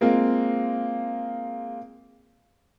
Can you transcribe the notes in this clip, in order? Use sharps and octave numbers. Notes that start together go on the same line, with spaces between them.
G#3 A#3 C4 F4